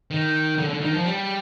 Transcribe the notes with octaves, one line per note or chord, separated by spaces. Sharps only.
D#3
D3
D3
D#3
F3
G3